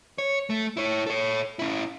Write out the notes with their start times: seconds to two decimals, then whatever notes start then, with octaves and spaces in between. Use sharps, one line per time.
0.18 C#5
0.50 A3
0.77 E4 C#5
1.07 A4 C#5
1.59 C#4 E4